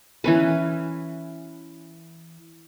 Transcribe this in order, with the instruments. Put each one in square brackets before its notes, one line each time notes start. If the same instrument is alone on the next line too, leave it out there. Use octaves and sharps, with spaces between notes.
[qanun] E3 C#4 B4